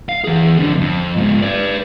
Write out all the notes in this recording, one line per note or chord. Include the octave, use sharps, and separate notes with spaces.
F5
E3 G#4
F2 D3
F2
G#2 F4
B4 D5